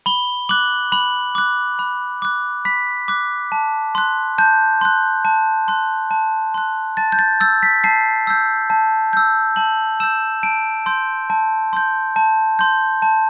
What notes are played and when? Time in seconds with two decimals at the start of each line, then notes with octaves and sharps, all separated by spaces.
0.06 B5 G7
0.49 D6 F#6 F#7
0.92 B5 F#7
1.35 D6 F#6
1.79 B5
2.22 D6 F#6
2.65 B5 B6
3.08 D6 F#6
3.52 A5
3.95 C6 F#6
4.38 A5 G6
4.81 C6 F#6
5.25 A5
5.68 C6 F#6
6.11 A5
6.54 C6 F#6
6.97 A5 A6
7.12 G6
7.19 A6
7.40 E6 G6 A6
7.63 B6
7.84 A5 C7
8.27 E6 G6
8.70 A5
9.13 E6 G6
9.56 A5 F#7
10.00 E6 G6 E7
10.43 A5 D7
10.86 C6 G6
11.30 A5
11.73 C6 G6
12.16 A5
12.59 C6 G6
13.02 A5